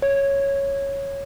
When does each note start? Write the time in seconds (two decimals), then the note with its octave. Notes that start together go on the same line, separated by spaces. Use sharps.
0.02 C#5